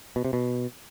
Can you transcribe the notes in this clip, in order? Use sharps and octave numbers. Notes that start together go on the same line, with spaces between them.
B2
C3
B2